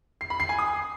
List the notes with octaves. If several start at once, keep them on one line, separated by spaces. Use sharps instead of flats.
C7
B5
C7
G#5
D#6